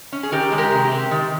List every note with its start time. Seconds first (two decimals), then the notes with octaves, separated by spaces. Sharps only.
0.12 C#4
0.23 G#4
0.32 D#3 G4 A#4
0.52 G#3
0.58 G4 A#4
0.72 C3
0.85 G4
0.92 C4
1.11 D#3